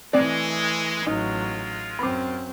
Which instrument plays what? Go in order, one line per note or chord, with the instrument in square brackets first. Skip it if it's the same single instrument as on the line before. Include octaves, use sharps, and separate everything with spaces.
[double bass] E3 A3 [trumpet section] G#3 [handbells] C4 D6 [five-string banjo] D5
[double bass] A1 F#3 [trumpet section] G#3 F4 [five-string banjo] D#4
[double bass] F#2 C4 [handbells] B5 D6